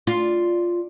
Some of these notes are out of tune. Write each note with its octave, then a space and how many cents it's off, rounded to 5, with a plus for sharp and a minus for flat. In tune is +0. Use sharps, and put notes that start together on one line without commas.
D4 +0 F4 +0